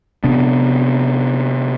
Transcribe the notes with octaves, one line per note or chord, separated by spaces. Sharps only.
C3 B3 D4